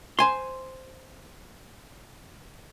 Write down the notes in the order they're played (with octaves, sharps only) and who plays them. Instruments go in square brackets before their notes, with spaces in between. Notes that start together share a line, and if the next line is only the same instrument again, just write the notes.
[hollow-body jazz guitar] C5 G#5 C6